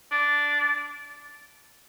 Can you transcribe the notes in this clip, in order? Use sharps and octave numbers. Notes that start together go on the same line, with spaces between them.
D4